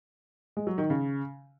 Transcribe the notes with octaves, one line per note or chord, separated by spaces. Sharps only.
G#3
F#3
D#3
C#3